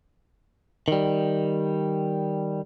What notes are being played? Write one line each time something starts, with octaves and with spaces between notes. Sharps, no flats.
D#3 G3